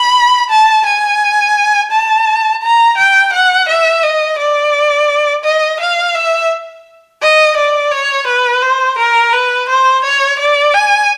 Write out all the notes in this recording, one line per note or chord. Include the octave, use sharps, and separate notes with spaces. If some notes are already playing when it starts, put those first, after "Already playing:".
Already playing: B5
A5
G#5
A5
A#5
G5
F#5
E5
D#5
D5
D#5
F5
E5
D#5
D5
C#5
B4
C5
A#4
B4
C5
C#5
D5
G#5